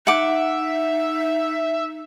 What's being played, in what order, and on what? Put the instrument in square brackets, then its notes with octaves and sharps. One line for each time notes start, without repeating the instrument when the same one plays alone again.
[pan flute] D#4 [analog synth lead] E5 [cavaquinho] F#5 D6